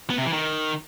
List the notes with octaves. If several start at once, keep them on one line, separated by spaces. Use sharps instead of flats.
B3
C3
E3
D#3